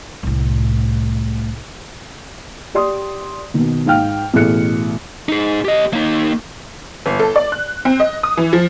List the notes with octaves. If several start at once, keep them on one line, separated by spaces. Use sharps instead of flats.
C2 A2
G4 D5 C6 D#6
B2 D#3
G#2 F5 G5 F6
A1 B2 G#4 A4 F#6 C#7
D#4 G#4
G4 D#5
A#3 D#4
G1
A4
D5
F#6
C4
D#5
D#6
E3
F3